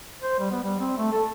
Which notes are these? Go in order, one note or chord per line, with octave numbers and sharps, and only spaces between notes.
C5
G3
B3
G3
C4
A3
A4